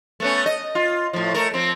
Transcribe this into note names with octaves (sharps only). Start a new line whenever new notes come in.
A3 B3 C#4
D#5
F4
A2 F3
A3 A#4
F3 C4